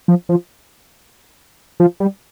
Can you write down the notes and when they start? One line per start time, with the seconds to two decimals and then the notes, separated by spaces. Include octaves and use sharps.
0.08 F3
0.29 F3
1.80 F3
2.00 G3